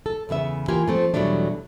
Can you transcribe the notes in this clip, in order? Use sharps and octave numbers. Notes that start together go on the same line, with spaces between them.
A4
E2 C#3 B3 E5
E3 A#3 F4 G4 G#5
F3 A3 C4
E2 B2 F#3 G3 A3 D4